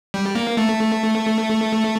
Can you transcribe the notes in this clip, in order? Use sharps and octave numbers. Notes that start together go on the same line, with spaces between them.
G3
A#3
A3